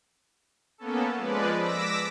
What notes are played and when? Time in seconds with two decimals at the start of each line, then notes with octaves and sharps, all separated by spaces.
0.78 A#3 B3 C#4 A4
1.16 F3 G#3 B4 D5
1.60 D6 E6 A#6 B6